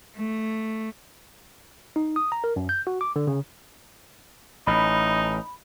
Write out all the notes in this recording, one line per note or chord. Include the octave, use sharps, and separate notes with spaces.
A3
D#4
D#6
A#5
A#4
F#2
G6
F#4
D6
D3
C#3
A1 D#4 B5